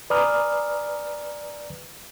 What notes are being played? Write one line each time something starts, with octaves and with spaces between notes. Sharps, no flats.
B4 D5 G#5 A#5 D#6 F6